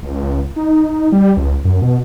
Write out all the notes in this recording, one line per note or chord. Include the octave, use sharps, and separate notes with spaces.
C#2
D#4
G3
C#2
F#2
B2